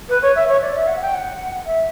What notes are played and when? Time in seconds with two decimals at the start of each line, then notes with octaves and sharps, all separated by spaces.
0.09 B4
0.22 C#5
0.35 E5
0.48 C#5
0.61 D5
0.75 E5
0.87 F#5
1.01 G5
1.13 F#5
1.66 E5